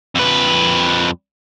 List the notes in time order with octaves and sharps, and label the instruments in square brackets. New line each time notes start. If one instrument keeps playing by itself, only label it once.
[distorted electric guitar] F2 B4